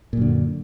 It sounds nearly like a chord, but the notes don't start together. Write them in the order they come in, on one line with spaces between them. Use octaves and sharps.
A#2 F#2 D3